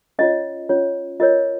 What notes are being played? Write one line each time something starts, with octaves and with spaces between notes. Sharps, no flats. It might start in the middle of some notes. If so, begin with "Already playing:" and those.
C#4 F4 C#5 D#5
C#4 F4 C#5
F4 A#4 C#5 D#5